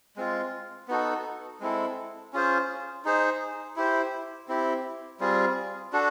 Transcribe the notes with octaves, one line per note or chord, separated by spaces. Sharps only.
G#3 C4 F4
B3 D#4 F#4 A4
G#3 C4 E4 A4
C#4 F4 G#4 C5
D#4 G#4 C5
E4 G4 C5
C4 E4 G4
G3 C4 F4 G#4
D4 F#4 A4